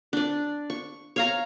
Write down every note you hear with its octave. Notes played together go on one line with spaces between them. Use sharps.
D4 D5
C#6
C#5 F5 A#5